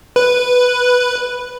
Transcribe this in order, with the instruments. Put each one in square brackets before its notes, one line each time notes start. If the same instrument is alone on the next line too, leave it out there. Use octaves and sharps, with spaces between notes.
[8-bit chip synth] B4